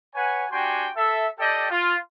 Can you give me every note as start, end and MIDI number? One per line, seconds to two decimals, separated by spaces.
0.15 0.45 71
0.15 0.45 73
0.15 0.45 78
0.15 0.45 80
0.52 0.89 62
0.52 0.89 66
0.52 0.89 67
0.52 0.89 79
0.52 0.89 80
0.52 0.89 84
0.97 1.27 69
0.97 1.27 76
1.39 1.68 67
1.39 1.68 69
1.39 1.68 74
1.39 1.68 75
1.39 1.68 79
1.71 1.96 65